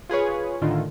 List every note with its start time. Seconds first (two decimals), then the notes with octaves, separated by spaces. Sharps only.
0.09 F4 G#4 B4 C#5
0.61 A2 D3 D#3 F4